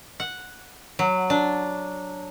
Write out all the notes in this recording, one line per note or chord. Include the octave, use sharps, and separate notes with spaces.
F#5
F#3
D4